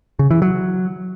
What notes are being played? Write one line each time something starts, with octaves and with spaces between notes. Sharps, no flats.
C#3
E3
F#3